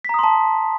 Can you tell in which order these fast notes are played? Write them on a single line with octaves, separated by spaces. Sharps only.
B6 A#5 D#6 C6 A5